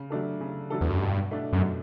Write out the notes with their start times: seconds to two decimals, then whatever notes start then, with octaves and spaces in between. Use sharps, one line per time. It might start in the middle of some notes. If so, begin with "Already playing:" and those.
Already playing: C#3
0.10 F#3 A3 D4 A4
0.41 C#3
0.70 F#3 A3 D4 A4
0.81 E2
0.90 F#2
1.01 G2 B2
1.31 A3 D4
1.53 F#2
1.61 B2